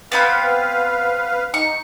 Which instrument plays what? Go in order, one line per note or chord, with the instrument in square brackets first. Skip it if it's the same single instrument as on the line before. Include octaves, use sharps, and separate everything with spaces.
[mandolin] B3 C4 B5 [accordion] B4 F5
[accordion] D#4 [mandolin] C#6